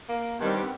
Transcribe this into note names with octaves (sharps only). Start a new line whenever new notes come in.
A#3
G2 D#3 G3 B3 C4
B3